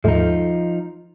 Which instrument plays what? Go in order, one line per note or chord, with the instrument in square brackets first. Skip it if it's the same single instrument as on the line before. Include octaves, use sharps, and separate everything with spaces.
[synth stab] D#2 G#2 A3 [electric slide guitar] F3 D#4